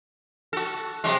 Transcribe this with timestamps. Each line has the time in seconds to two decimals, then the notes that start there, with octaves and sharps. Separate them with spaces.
0.53 F#4 A4
1.04 C3 F#3 G#3